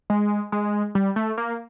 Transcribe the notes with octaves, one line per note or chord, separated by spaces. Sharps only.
G#3
G#3
G3
A3
A#3